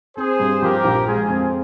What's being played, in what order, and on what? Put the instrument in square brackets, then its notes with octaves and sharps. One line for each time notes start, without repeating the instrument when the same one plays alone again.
[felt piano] C4 [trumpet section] G#4 C5
[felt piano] G2
[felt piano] F3 [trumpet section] G4 A#4
[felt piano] A#1
[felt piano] G#3 [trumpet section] F4 G#4
[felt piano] F2